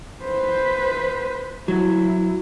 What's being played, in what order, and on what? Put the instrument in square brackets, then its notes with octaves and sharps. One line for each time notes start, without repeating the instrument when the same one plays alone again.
[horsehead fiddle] B4 C5
[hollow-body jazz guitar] F#3 [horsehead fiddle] E4